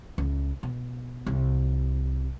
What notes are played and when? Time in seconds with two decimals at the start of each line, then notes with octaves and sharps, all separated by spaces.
0.18 C#2
0.63 B2
1.26 C2